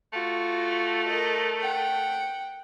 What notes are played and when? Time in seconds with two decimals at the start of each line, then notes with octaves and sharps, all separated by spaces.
0.13 A3 F4 F#4
1.07 A#4 D#5
1.60 F#5 G5